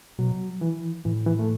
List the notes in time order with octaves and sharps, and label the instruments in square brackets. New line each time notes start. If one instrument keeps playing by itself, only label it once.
[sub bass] B2 [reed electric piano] F#3
[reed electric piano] E3
[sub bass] A2 [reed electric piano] E3
[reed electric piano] E3
A3